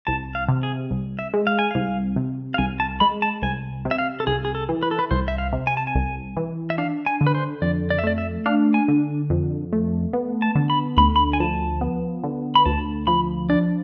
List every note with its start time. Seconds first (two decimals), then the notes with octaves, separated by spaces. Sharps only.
0.07 C2 A5
0.35 F5
0.48 C3
0.63 G#4
0.91 C2
1.19 E5
1.34 G#3
1.47 F5
1.59 G#5
1.71 C2 F5
2.16 C3
2.54 F5
2.58 C2 G#5
2.80 A5
3.00 G#3 B5
3.22 A5
3.42 C2 G#5
3.85 C3
3.91 E5
3.98 F5
4.20 A4
4.27 C2 G#4
4.45 G#4
4.55 A4
4.69 E3
4.83 B4
4.91 A4
4.99 B4
5.11 C2 C5
5.28 E5
5.38 F5
5.53 C3
5.67 G#5
5.77 A5
5.87 G#5
5.95 C2
6.37 E3
6.70 E5
6.78 D4 F5
7.06 G#5
7.21 D3
7.27 B4
7.35 C5
7.62 F2 D5
7.90 D5
7.99 E5
8.04 A3 D5
8.18 E5
8.46 D4 F5
8.74 G#5
8.88 D3
9.30 F2
9.73 A3
10.13 B3
10.42 A5
10.55 D3
10.70 B5
10.97 D2 B5
11.16 B5
11.33 G#5
11.40 F3 A5
11.81 B3
12.24 D3
12.55 B5
12.66 D2 A5
13.07 F3 B5
13.49 D4 D5